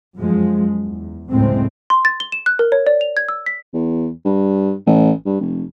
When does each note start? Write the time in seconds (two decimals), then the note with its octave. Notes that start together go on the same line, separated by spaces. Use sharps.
0.17 F#2 F3 G#3
0.85 E2
1.31 F#1 D2 A2 G#3 A3 C4
1.90 C6
2.05 A6
2.20 G7
2.32 E7
2.46 F#6
2.59 A#4
2.72 C#5
2.87 D5
3.01 F7
3.17 G#6
3.29 E6
3.46 B6
3.74 E2
4.25 G2
4.86 A1
5.26 G2
5.41 F1